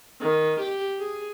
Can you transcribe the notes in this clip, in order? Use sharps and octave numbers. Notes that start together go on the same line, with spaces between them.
D#3
G4
G#4